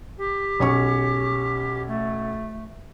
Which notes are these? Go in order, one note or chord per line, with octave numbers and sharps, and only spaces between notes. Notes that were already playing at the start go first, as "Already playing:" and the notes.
G4
B1 C#4 C#6
A3